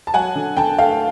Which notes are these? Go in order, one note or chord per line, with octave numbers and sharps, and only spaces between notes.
A5
F#3 F#5 G#5
D3
D3 G5 A5
A3 F5 G5